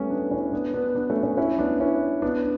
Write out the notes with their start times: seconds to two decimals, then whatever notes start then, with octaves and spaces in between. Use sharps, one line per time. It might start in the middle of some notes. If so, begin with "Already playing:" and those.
Already playing: G3 A3 B3 C#4
0.10 B3 D4
0.31 C#4 E4
0.52 B3 D4
0.74 B3 D4
0.95 B3 D4
1.10 A3 C#4
1.23 A3 C#4
1.37 C#4 E4
1.59 B3 D4
1.80 C#4 E4
2.22 B3 D4